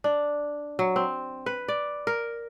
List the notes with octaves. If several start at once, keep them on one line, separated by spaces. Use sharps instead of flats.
D4
F#3
C4
B4
D5
A#4